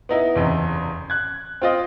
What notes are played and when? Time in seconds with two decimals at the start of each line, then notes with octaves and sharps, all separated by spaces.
0.09 B3 D#4 E4
0.35 F#1 E2 C3
1.10 F#6 G#6
1.62 C4 F4 D#5